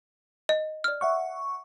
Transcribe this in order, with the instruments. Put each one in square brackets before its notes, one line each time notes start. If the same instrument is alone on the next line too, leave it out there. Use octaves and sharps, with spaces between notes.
[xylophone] D#5
D5 F6
[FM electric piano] E5 F#5 C#6